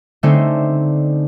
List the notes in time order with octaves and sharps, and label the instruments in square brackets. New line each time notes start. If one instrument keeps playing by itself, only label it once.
[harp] D3 A3 C4 C#4 D#4 C5